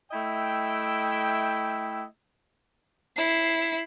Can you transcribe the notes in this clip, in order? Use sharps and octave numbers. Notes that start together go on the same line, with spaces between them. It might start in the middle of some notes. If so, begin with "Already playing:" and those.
A3 E4 D#5 E5 G5
E4 C7